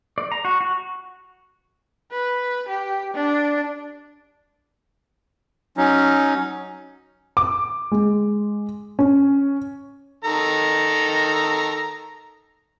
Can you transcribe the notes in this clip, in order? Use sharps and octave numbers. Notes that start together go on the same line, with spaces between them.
D5
A#5
F#4
F#4
B4
G4
D4
F#3 C#4 D#4
D6
G#3
C#4
D#3 A4 A#5